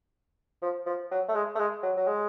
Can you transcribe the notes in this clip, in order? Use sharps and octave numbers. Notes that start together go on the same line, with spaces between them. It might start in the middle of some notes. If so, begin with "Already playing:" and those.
F3
F3
F#3
A3
G#3
A3
G#3
F#3
F#3
G#3